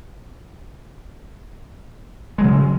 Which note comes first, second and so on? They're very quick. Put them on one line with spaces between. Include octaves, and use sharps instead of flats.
G#3 F#3 C#3